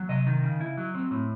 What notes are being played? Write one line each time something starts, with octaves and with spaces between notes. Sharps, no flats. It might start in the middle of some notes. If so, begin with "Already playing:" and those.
Already playing: F#3
C3 D#5
D#3
C#3
E4
F#3
C4
A2